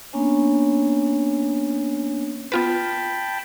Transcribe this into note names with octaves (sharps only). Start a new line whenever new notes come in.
A#3 B3 C#4 D4 C#5 G#5
B3 F4 B4 G5 A5 B5